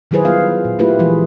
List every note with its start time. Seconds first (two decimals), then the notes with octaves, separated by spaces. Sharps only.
0.11 D#3 F#3 E4 G#4 B4 C5
0.25 F#3 G3 B3 F4 F5
0.65 A#2
0.79 A3 A#3 E4 F4 G4 B4
0.99 E3 F3 G#3 G#4